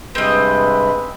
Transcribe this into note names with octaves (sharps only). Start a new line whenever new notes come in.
G2 C3 G#3 C4 B4 D#5